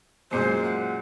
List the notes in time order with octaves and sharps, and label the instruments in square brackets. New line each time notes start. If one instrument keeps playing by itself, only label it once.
[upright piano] F#2 A#2 G#3 [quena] C5
[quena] F#5